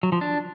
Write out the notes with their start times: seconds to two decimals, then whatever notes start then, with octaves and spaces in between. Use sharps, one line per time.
0.03 F#3
0.12 F3
0.21 D4